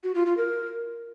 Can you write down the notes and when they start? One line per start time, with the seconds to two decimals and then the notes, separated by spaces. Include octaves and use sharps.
0.04 F#4
0.15 F4
0.26 F4
0.37 A#4